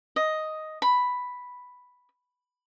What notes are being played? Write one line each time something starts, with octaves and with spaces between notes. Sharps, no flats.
D#5
B5